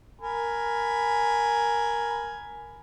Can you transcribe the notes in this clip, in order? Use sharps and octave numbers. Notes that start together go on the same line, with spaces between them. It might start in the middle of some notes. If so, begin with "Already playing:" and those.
A#4 G#5 B5